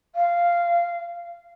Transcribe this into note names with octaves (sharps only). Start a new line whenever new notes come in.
F5